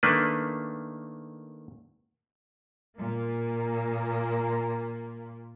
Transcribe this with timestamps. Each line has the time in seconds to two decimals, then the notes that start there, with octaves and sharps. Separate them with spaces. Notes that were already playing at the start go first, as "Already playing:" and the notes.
0.03 D#3 A3 A#3 D4 B4
2.97 A#2 A#3